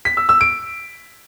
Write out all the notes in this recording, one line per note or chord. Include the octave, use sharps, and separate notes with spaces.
B6
E6
E6
D7